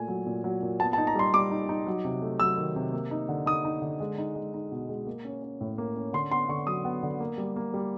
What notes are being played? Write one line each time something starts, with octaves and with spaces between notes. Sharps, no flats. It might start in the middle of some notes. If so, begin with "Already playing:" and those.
Already playing: A#2 A3 G#5
F#3
A#2
F#3
A#2
B3 A5
A5
D#4
A#5
G3 C6
G3 D6
D#4
D#4
F#3
C3
A3
F#3 E6
D#3
C3
A#3
D#4
D3
D#4 D#6
D#4
D3
G#3
D#4
G#3
D#4
B2
G#3
A#3
C#4
C#4
A2
A#3
C#4
D3 C6
B3 C6
D3 C#6
F#3 D#6
B3
D3
A#3
G3
A#3
G3